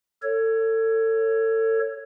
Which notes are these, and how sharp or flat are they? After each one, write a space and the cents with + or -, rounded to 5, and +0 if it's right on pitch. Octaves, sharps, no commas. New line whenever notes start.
A4 +30 C#5 +0